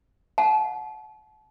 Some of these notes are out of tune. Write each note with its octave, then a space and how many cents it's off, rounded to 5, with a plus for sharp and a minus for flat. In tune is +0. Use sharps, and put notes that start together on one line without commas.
F#5 -20 A5 -35